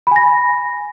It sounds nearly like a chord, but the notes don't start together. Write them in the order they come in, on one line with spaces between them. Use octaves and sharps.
B5 G#5 A#6